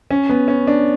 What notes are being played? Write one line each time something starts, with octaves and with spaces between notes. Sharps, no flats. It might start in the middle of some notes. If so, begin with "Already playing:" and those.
C#4
B3
C#4
D4